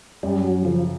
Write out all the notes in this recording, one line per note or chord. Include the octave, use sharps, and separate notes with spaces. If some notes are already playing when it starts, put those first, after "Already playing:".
F#2 G3
F#3
C#3 F3